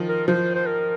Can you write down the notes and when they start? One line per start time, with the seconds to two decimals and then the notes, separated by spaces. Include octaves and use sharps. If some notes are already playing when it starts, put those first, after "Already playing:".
Already playing: D#3 F3
0.08 A#4
0.28 F3 C5
0.55 C5
0.66 A#4